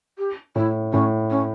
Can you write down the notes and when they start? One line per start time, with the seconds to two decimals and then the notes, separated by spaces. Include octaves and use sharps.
0.18 G4
0.56 A2 E4
0.93 A2 C#4
1.30 C#4